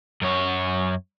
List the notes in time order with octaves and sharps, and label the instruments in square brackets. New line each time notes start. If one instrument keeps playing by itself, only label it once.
[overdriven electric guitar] F#2 C#5